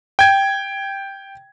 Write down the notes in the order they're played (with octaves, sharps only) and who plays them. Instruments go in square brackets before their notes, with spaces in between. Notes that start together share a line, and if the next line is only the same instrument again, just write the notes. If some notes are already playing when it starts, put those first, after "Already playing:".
[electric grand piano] G5 G#6